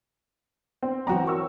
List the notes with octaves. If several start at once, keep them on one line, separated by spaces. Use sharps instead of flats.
C4
E3 F#3 C4 F#4 G5 A#5
A#4 C#6 E6